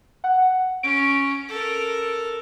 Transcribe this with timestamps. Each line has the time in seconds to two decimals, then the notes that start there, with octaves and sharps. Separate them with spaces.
0.24 F#5
0.83 C#4 D7
1.48 A4 A#4